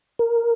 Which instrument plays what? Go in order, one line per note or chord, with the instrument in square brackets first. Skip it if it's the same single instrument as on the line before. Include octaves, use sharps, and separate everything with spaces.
[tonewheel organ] A#4